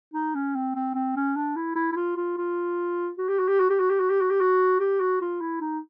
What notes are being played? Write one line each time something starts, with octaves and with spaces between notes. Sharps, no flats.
D#4
C#4
C4
C4
C4
C#4
D4
E4
E4
E4
F4
F4
F4
F#4
G4
F#4
G4
F#4
G4
F#4
G4
F#4
G4
F#4
G4
F#4
G4
F#4
F4
E4
D#4